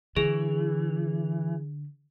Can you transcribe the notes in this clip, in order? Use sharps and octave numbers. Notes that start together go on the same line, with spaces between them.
D3 E3 G#4